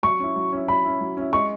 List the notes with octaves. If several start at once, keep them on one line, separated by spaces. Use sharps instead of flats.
F#3 C#6
C#4 E4
F#3
C#4 E4
F#3 B5
C#4 E4
F#3
C#4 E4
G#3 C#6